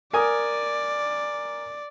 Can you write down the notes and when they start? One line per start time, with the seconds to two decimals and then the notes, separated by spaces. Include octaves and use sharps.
0.13 A#4 D5 G#5 D#6